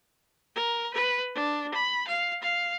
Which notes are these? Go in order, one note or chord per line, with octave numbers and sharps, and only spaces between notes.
A#4
B4
D4
B5
F5
F5